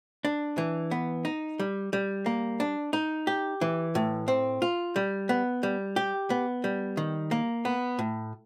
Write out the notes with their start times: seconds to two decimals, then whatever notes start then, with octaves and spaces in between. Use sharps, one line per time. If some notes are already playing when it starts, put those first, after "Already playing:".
0.25 D4
0.58 E3
0.91 B3
1.25 D#4
1.59 G3
1.93 G3
2.26 A#3
2.60 D4
2.93 D#4
3.27 G4
3.61 E3
3.95 A2
4.28 C4
4.62 F4
4.96 G3
5.29 B3
5.63 G3
5.96 G4
6.30 B3
6.64 G3
6.97 D#3
7.31 A#3
7.65 B3
7.99 A2